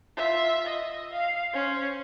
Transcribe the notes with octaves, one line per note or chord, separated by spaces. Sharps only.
F4 E5
D#5
F5
C#4 C5